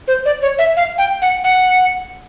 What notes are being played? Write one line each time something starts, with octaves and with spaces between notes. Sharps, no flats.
C5
D5
C#5
E5
F5
G5
F#5
F#5